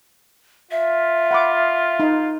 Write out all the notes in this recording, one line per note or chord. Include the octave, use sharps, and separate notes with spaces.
F4 E5
F#5 B5 D6
D#4